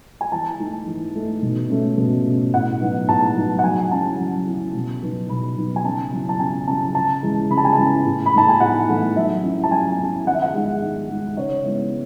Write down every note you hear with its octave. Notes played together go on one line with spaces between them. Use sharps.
G#5
E3 A5
A3 D#4
E3
A3 D#4
B2
A3 C#4
B2
A3 C#4
A2 F#5
F#3 B3 D#4
A2 A5
F#3 B3 D#4
F#5
F#3 G#5
C#4 E4 A5
F#3
C#4 E4
B2
F#3 B3 D#4
B2 B5
F#3 B3 D#4
G#5
C#3 A5
F#3 C#4 E4
A5
C#3 G#5
F#3 C#4 E4 A5
C#3 A5
E3 G#3 C#4
C#3 B5
A5
G#5
A5
E3 G#3 C#4
A2
B5
E3 A3 D#4 A5
G#5
A2 F#5
E3 A3 D#4
F#3 E5
C#4 E4
A5
F#3 G#5
C#4 E4
D#3 F#5
E5
F#5
G#3 D#4
D#3
G#3 D#4
C#3 C#5
G#3 B3 E4